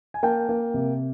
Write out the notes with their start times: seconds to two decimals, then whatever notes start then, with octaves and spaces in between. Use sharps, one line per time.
0.14 G#5
0.23 A#3 G5 A5
0.49 A#3
0.74 C3